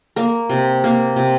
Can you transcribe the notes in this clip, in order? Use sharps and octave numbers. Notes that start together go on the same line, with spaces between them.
A#3 A#4
C3
A#3
C3